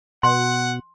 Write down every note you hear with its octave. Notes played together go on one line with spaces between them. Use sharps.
B2 F#5 C6